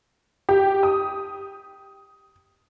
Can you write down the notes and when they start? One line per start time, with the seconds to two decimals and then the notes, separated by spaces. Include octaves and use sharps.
0.49 G4
0.83 D#6